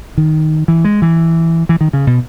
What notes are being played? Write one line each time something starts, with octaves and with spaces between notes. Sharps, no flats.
D#3
E3
G#3
E3
E3
D#3
C#3
B2